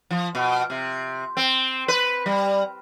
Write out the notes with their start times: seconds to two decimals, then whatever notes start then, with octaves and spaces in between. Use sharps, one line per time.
0.11 F3
0.35 B2
0.70 C3
1.37 C4
1.88 B4
2.26 G3